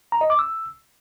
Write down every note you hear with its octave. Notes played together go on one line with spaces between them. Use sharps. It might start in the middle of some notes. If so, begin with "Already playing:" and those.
A#5
D#5
D6
E6